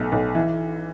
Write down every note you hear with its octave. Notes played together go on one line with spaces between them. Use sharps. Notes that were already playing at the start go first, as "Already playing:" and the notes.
Already playing: B1 A3
B1
E3